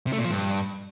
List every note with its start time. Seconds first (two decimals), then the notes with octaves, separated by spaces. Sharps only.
0.07 C3
0.13 A3
0.19 A#2
0.25 F3
0.31 G2